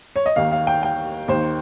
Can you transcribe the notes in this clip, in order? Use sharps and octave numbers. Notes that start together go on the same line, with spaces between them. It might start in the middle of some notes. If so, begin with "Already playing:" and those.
C#5
D#5
D#2 D#3 F5
F5
G5
G5
D#2 D#3 C5